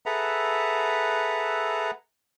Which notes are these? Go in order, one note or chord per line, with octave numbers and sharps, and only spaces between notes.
G#4 A4 B4 E5 F#5 A#5